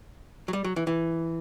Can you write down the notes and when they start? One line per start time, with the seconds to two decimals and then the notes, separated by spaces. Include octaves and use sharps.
0.48 F#3
0.53 G3
0.64 F#3
0.76 E3
0.87 E3